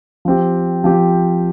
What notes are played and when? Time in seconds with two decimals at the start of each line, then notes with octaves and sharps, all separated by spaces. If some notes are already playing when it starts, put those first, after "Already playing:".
0.25 F3 C4 G4
0.84 F3 C4 G4